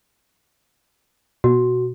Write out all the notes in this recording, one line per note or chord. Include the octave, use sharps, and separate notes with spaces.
B2 F#4